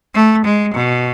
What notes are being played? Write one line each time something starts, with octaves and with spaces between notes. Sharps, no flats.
A3
G#3
B2